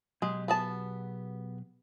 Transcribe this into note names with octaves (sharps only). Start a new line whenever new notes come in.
B2 F#3 G#3 G4
B3 G#4 A5